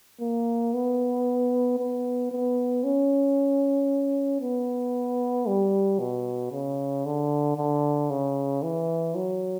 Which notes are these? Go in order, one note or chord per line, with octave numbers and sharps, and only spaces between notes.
A#3
B3
B3
B3
C#4
B3
G3
B2
C#3
D3
D3
C#3
E3
F#3